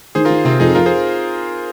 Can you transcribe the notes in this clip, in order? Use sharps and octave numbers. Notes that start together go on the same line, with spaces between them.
D#3 G#4 C5
F4 A#4
D#3
C3 C4 F4
F2 D#4 G#4
F2 F4 A#4
G#4 C5